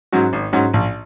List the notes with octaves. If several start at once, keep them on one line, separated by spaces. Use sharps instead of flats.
G#2 F#3 C#4 F#4
G#1
G#2 F#3 C#4 F#4
A#1